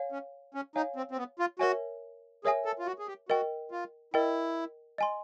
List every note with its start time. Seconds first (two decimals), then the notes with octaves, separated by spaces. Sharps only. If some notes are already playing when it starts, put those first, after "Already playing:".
Already playing: C#5 F5 G#5
0.12 C#4
0.55 C#4
0.76 D#4 C#5 F5 G#5
0.96 C4
1.11 C4
1.18 B3
1.39 F4
1.59 F#4 A#4 C#5 E5 G#5
2.44 G#4 A#4 C#5 E5 G#5
2.65 A4
2.79 F4
2.86 F#4
2.99 G#4
3.07 G4
3.29 F#4 A#4 D#5 G5
3.71 F4
4.14 E4 A#4 D#5 G5
4.98 D#5 G#5 C6